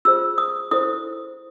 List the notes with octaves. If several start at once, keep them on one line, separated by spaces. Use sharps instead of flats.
F4 G#4 C5 E6
D#6
E4 A4 C5 D#6